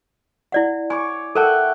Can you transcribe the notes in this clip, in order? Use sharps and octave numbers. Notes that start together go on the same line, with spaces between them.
E4 D5 F#5
C#5 G#5 C#6 D6
A4 A#4 E5 F#5 G5 A5